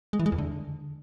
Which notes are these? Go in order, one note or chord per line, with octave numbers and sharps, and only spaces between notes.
G#3
E3
G#3
E2
D3